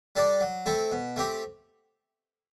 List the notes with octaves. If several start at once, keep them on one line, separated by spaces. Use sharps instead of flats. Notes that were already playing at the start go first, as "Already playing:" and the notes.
G3 D4 A4 D5
F#3
A3 C4 E4 A4
B2
A3 C4 G4